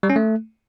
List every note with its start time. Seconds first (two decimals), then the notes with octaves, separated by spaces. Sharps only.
0.03 G3
0.10 C#4
0.16 A3